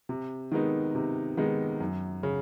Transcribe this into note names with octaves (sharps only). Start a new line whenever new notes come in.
C3
D#3 G#3 B3 D#4
C3
D#3 G#3 B3 D#4
F#2
C#3